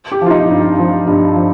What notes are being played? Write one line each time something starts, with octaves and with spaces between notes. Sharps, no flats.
G4
F3 F4
D#4
G2
F3
G2
F3